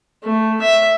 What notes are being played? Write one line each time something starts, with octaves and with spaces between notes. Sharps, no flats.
A3
E5